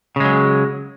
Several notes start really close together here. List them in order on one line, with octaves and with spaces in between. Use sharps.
C#3 G#3 F#3